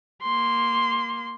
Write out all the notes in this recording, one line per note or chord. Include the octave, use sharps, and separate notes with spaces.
A#3 C6